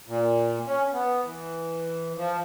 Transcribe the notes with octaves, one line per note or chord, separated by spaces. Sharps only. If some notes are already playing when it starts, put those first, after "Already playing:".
A#2
C#4
B3
E3
F3